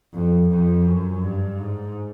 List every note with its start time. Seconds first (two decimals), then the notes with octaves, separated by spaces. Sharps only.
0.13 F2
0.50 F2
0.87 F#2
1.24 G2
1.60 G#2